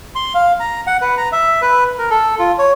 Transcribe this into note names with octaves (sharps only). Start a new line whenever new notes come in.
C6
F5
A#5
F#5
B4
A#5
E5
B4
A#4
A4
F4
C#5